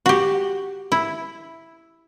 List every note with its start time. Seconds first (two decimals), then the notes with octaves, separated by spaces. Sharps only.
0.06 F#4 G4
0.92 E4